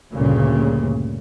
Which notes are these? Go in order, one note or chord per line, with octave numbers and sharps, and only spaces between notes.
D2 G2 A#2 C#3